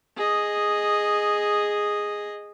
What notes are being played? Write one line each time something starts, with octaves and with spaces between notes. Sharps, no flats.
G#4 D#5